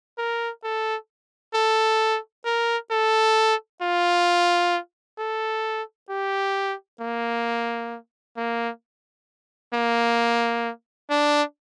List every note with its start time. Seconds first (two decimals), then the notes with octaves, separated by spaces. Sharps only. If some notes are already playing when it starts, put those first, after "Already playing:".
0.18 A#4
0.63 A4
1.54 A4
2.45 A#4
2.91 A4
3.82 F4
5.18 A4
6.10 G4
7.01 A#3
8.37 A#3
9.74 A#3
11.10 D4